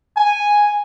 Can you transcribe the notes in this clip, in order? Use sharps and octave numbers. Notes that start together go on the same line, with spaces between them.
G#5